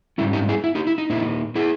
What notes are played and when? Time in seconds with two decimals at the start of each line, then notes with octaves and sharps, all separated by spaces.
0.18 G#2 G3 C#4 E4
0.33 D#4 G4
0.49 E4 G#4
0.64 E4
0.75 D#4 G4
0.87 E4
0.98 D#4
1.10 A#2 A#3 D#4 E4
1.55 E4 G#4